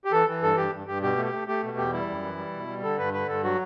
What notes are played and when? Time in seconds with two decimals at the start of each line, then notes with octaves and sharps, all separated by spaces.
0.05 G4
0.12 E3 A4
0.27 E3
0.42 G2 A4
0.57 G2 G4
0.73 G2
0.87 G2 G4
1.02 B2 G4
1.17 A3
1.25 G4
1.33 A3
1.47 A3 G4
1.63 B2
1.78 E2 G4
1.93 G3 E4
2.08 F#2
2.23 E3
2.38 G3
2.53 B2
2.68 G3
2.83 D3 A4
2.98 G2 B4
3.13 D3 B4
3.28 G2 A4
3.44 F#3 F#4